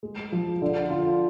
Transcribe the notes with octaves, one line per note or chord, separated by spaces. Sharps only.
G#3
F3
D3
F4